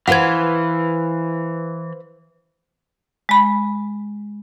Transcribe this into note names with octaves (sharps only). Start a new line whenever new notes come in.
E3 B4 C5 F5 F#5 G#6
G#3 B5